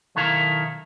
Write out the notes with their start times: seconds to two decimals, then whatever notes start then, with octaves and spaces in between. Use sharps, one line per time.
0.16 B1 D#3 E4 A4 A#4 F5